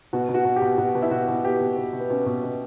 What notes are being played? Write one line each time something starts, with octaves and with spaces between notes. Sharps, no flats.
B2 F#4
B2
F#4
B2
G4
B2
B2 F#4
B2
E4
B2 F#4
B2
B2 G4
B2
B2
B2
B3
B2 C#4
B2
B2